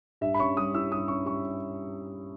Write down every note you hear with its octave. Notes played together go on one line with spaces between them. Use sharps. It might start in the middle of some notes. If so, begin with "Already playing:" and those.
G2 E5
B5
C#4 C#6
G3 D#6
E4 E6
G2 D#6
C#4 C#6
G3 C#6